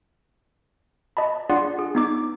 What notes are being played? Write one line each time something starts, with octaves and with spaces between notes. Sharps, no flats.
D#5 A5 B5
D4 F4 G#4 D5 F#5 C6
G#4
B3 D#4 D6